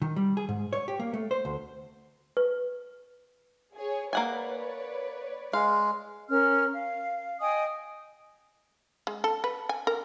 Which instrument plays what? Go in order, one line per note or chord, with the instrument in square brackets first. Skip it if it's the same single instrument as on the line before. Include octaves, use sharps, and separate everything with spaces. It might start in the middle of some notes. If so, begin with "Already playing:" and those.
[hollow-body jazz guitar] D#3
G3
G#4
G#2
C#5
G4
A#3
A3
C5
D2
[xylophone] B4
[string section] G#4 C#5
[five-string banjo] A#3 F#5 G#5 [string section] B4 C#5 D5
[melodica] G#3 [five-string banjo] F5
[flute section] C#4 A#4 F6
F5
D#5 G5 G#5 D#6
[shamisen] G#3
A4
B4
G#5
A#4